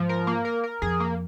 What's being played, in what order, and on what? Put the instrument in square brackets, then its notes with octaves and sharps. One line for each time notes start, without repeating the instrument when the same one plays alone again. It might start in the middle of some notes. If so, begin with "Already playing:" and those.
Already playing: [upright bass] G#2 [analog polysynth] F3
[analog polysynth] A#4
A#3
A#4
A#4
[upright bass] F2 [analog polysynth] G#4
[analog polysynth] A#3